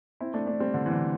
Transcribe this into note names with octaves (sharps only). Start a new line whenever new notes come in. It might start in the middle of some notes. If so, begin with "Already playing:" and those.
C4 E4
A3 D4
A3 D4
G3 C4
D3
E3
D3